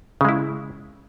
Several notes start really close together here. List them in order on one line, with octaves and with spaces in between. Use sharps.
C#3 G#3 E4